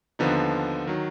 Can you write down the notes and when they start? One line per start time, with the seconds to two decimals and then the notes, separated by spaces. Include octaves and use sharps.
0.19 D#2 D3 F3 B3 D#4
0.87 D#3 F#3